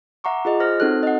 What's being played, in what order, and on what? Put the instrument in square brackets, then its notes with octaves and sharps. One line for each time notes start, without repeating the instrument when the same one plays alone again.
[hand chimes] E5 F#5 A#5 C#6 D6
F4 G#4 D#5
C5 F6 A#6
C4 D#4 F#4 A4 C#5 F#6
D#5 F#5